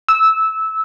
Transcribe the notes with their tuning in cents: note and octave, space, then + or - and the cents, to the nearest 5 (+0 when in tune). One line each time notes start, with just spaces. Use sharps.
E6 -15